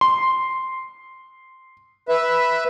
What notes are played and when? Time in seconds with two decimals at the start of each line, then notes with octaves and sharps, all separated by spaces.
0.01 C6
2.09 B4 E5